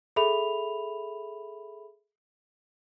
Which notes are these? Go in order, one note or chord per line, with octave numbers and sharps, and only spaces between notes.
G#4 A4 E5 B5 F7